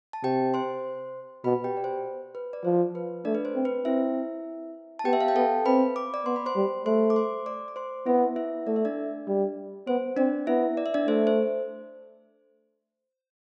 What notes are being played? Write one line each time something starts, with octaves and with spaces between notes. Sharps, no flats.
A5
C3 G4 G5
C5 C6
B2 B4 B5
G4 G5
D5
C5
B4
D5
F3 C5
B4
A3 D4 D5
B4
C5
C4
B4
C4 E4 E5
A5
B3 G4 G5
E5
F5
G5
B3 A4 A5
C4 B4 B5
D6
D5 D6
B3 C6
B5
C5 C6
G3
A3 C5 C6
D6
C5 C6
D5 D6
D6
C5 C6
B3 E4 E5
E4 E5
A3 D5
E5
D4 D5
G3
B3 C5
C4 D4 D5
B3 E4 E5
D5
E5
D4 D5
A3 C5
C5